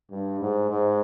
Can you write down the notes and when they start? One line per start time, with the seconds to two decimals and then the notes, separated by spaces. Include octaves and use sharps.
0.11 G2
0.40 G#2
0.69 G#2